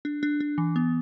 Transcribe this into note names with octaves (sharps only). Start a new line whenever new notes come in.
D4
D4
D4
E3
B3